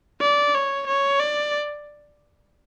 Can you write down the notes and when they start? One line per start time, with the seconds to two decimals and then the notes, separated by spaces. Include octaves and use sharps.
0.21 D5
0.55 C#5
0.87 C#5
1.20 D5